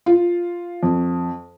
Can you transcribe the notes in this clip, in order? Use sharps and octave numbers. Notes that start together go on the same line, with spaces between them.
F4
F2